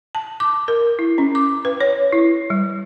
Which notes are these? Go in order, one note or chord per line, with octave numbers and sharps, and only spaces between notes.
A5
D6
A#4
E4
C#4
D6
B4
C#5
E4
G3